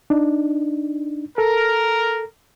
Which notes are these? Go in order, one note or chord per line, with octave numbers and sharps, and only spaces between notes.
D4 D#4
A4 A#4